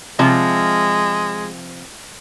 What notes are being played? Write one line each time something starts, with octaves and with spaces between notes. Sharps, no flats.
C3 F3 G#3